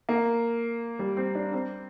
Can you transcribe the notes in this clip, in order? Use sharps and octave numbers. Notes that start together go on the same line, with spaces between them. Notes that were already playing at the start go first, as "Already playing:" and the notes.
A#3
G3
C4
D4
C4